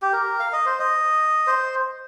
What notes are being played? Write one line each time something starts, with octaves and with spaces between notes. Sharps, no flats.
G4
A#4
F5
D#5
C5
D#5
C5